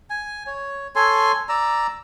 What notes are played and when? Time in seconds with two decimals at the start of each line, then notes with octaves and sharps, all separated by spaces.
0.10 G#5
0.47 C#5
0.96 A4 C#5 G#5 C6
1.49 D5 A#5 E6